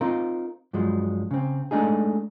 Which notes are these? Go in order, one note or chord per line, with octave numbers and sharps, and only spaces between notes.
C4 D#4 F4 A#4
G2 F3 F#3 G#3
C#3 C4
G#3 A3 D4 D#4 G#4